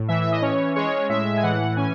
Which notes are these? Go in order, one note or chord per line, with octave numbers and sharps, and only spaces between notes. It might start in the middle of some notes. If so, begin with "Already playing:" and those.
Already playing: A2
E3 E5
E5
D#5
C#4 C#5
G#3 C#5
A2 E5
G#5
E3 F#5
C#4 G#5